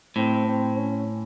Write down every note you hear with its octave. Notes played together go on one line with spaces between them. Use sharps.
A2 C4
C4
C#4